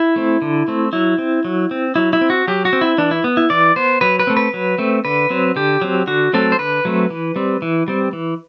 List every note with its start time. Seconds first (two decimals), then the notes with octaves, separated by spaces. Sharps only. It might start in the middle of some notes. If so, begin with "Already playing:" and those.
Already playing: E4
0.16 A3 C4
0.42 D3
0.68 A3 C4
0.93 F#3 E4
1.18 C4
1.45 F#3
1.71 C4
1.96 F#3 E4
2.13 E4
2.21 C4
2.30 F#4
2.48 F#3 G4
2.65 F#4
2.73 C4
2.81 E4
2.98 E3 D4
3.11 E4
3.24 B3
3.37 E4
3.50 E3 D5
3.76 B3 C5
4.01 F#3 B4
4.19 B4
4.27 A3 C4
4.37 B4
4.54 F#3
4.78 A3 C4
5.05 D3 B4
5.30 F#3 C4
5.56 D3 G4
5.81 F#3 C4
6.07 D3 F#4
6.33 F#3 A3 C4 A4
6.52 C5
6.59 D3 B4
6.85 F#3 A3 C4
7.10 E3
7.36 G3 C4
7.62 E3
7.88 G3 C4
8.13 E3